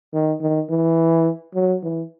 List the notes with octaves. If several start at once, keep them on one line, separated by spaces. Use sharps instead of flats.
D#3
D#3
E3
F#3
E3